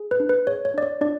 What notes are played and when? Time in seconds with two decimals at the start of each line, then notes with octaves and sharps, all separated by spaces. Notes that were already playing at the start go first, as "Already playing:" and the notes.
Already playing: G#4
0.11 B4
0.20 D4
0.29 B4
0.47 G#4 C#5
0.65 C#5
0.74 D4 D5
0.82 C#5
1.01 D4 F4 D5